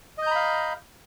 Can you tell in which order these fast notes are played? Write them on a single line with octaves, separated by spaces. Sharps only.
D#5 G6 A#5 B5 F5